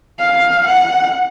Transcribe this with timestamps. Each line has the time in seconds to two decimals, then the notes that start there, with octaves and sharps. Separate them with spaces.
0.19 F5
0.66 F#5